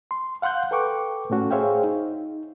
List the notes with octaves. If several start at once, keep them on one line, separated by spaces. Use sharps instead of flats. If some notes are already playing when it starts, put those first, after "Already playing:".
C6
F5 F#5 C6 F#6 G6
A4 B4 G5 C#6 D6
A2 A3 C#4 F#4 A4
G#4 C5 C#5 E5 F5 G5
D#4